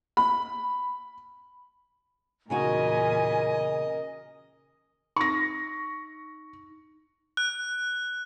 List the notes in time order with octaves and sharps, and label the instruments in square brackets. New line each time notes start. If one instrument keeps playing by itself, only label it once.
[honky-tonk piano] B5
[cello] E2 A#2 [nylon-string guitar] C#3 D#4 F#4 [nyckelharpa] A#4 D#5 [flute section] G#5
[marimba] D#4 [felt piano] C#6 A#6
[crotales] F#6